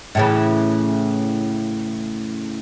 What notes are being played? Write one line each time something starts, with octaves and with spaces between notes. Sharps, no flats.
A2 C#3 E3